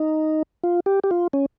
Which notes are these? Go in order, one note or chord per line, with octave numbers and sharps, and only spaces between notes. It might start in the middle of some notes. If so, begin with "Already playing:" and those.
Already playing: D#4
F4
G4
G4
F4
C#4